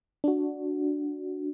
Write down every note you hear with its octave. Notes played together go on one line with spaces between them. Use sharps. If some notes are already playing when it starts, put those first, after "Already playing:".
D4 F#4